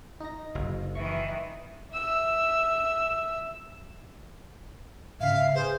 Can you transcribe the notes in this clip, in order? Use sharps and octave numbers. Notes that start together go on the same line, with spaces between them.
D#4 A#6
F#1
D#3 E3 E5 C#6
E5 E6
G#2 C#3 E5 F5
G#4 B4 C5